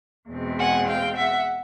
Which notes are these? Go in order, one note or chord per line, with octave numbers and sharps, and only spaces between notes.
E2 B2 G#3 C4
F#5 G#5
F5 G5
E5 F#5